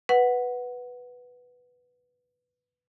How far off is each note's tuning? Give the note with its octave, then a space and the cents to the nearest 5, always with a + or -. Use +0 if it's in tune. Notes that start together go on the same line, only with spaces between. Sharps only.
B4 +0 F#5 +0